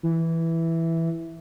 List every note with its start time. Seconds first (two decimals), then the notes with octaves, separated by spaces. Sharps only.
0.03 E3